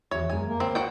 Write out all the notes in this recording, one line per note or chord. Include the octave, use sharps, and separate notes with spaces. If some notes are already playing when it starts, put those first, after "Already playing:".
E2 F#4 C#5 E5
F#2 G#3 A#4 G#5
A#3
D2 C4 C#5 D5
F#4 G5